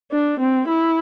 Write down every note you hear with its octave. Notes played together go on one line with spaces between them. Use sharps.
D4
C4
E4